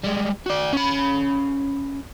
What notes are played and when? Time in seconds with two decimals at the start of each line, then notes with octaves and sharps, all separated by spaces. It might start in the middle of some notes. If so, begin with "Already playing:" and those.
0.03 G3 G#3
0.46 F#4 D5
0.73 C#4 B5